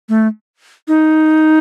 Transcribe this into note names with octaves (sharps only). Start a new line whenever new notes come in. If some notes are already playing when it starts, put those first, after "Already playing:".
A3
D#4